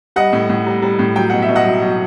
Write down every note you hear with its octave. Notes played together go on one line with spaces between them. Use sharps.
G3 D#5 F#5
A2
A2
G3
G3
A2
F#3 G5
B2 F#5
E5
B2
D#5 F#5
F#3
F#3